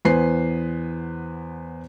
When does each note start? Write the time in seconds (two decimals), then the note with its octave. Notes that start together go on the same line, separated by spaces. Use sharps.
0.05 E2 B3 B4 C5 G#5 C7